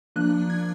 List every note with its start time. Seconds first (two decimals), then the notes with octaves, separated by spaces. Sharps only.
0.16 F3 A#3 D4 F#6
0.50 G#6